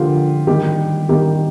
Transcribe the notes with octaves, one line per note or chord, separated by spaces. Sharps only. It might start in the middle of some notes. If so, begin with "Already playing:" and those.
Already playing: D3 F3 A#3 F4 G4
D#3 G3 A#3 G4
D#3 G3 A#3 G4